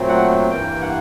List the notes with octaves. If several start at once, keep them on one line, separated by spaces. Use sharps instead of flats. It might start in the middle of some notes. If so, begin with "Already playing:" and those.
Already playing: A#2 F#3 A3 C4
F#5
G2 E3 G3 A#3 G5
F#5